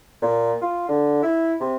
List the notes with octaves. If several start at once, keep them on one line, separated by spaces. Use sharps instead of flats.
A#2
F4
D3
E4
C3